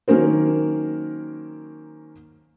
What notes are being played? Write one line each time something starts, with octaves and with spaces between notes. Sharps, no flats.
D#3 F#3 A#3 C#4 A#4 C5